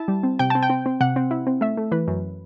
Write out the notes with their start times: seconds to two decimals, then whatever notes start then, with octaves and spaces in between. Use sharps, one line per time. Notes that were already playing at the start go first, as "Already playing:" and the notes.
Already playing: E4 A5
0.08 G3
0.23 C4
0.39 C3 G5
0.50 C4 A5
0.63 G5
0.70 C4
0.86 C4
1.00 C3 F#5
1.16 C4
1.31 E4
1.47 C4
1.61 A3 E5
1.77 A3
1.92 E3 B4
2.08 F#2